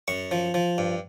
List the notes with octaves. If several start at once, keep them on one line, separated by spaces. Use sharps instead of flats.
F#2 C#6
F3
F3
G2